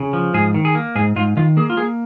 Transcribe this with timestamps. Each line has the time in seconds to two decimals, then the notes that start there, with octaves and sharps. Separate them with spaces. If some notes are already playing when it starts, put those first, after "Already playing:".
Already playing: C#3
0.13 F3
0.34 G#2 G#4
0.54 D#3
0.65 G#4
0.75 A#3
0.95 G#2 G#4
1.16 G#2 F4
1.37 D#3 F4
1.57 A#3 G#4
1.70 F4
1.77 A#3 G#4